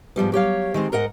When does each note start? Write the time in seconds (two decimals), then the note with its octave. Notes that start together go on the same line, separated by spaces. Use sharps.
0.16 G#2 F3 G3 B3
0.32 F#3 G4 C#5 F5
0.74 D#3 G#3 C4
0.92 G#2 A#4 D#5 F#5